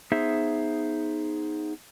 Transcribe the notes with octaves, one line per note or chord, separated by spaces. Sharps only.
B3 D#4 G#4 C5 E5